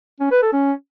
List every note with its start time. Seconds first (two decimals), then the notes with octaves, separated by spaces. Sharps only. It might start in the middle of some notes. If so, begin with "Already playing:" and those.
0.20 C#4
0.31 B4
0.42 A4
0.53 C#4